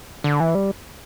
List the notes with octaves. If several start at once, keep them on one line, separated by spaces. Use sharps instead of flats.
D3
E3
G3